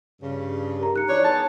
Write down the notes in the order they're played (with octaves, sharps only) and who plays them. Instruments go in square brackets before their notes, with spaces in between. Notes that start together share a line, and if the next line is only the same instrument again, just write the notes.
[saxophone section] G2 C#3
[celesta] G4 A#4 A#5
D#4 F#6 C#7
[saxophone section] E3 F3 D4 [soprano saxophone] C#5
[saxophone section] G#3 B3 [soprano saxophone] A5